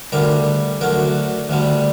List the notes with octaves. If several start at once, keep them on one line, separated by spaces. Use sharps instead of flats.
D2 D3 G3 A#4
D2 D3 F#3 A#4
D2 D3 G3